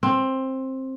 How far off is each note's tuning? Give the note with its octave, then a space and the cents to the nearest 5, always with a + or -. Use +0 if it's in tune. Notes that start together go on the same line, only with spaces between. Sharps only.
C4 +15